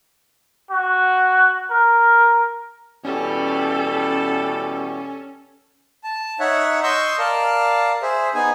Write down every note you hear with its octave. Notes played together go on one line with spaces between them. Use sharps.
F#4
A#4
B2 E3 G3 C#4 A4
A5
D#4 C#5 E5 F#5
D#5 C6 C#6 E6 G6
A#4 D5 F5 A5
G#4 C5 E5
B3 D#4 G#4 G#5